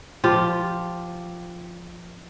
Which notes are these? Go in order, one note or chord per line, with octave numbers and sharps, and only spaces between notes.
F3 F4 G4